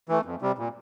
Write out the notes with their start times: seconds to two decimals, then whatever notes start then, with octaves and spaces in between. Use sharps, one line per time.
0.09 E3 A3
0.25 F2
0.42 C3 G3
0.58 A#2